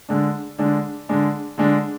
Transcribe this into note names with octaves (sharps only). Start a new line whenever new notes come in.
D3 G#3 D4
D3 G#3 D4
D3 G#3 D4
D3 G#3 D4